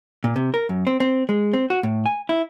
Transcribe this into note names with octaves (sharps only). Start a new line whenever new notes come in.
A#2
C3
A#4
F#2
C4
C4
G#3
C4
F#4
A2
G#5
E4